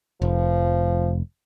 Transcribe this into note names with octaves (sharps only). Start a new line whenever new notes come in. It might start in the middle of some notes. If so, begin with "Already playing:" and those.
F1 F3